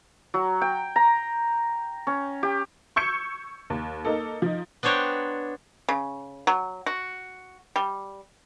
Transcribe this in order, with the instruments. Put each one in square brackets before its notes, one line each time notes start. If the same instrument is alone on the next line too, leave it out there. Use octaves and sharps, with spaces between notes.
[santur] F#3
G5
A#5
C#4
G4
[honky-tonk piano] C#6 E6 G6 G#6 C#7
D#2
A#3 D#4 A4
F3 D#4
[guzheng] B3 D4 C5 C#5 G5 A#5
[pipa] C#3
F#3
F#4
G3